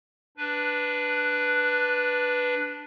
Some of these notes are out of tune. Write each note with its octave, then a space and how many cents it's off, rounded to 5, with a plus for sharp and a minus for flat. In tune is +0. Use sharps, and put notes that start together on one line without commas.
D4 +0 B4 +0